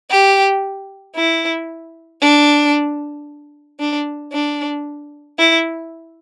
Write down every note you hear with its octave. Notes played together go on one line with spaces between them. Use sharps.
G4
E4
D4
D4
D4
E4